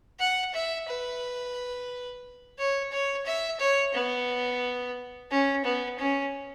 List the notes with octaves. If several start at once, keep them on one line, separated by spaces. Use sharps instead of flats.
F#5
E5
B4
C#5
C#5
E5
C#5
B3
C#4
B3
C#4